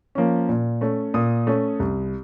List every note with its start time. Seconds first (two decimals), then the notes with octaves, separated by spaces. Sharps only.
0.15 F3 A#3 C#4
0.49 A#2
0.81 A3 C#4
1.14 A#2 D#6
1.47 A3 C#4
1.80 C2